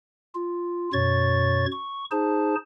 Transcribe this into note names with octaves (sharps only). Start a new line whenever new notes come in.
F4
F#2 B2 C#5 C#6 A6
C#6
D#4 G#4 C5 A5